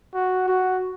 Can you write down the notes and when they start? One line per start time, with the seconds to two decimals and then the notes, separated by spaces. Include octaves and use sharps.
0.14 F#4
0.48 F#4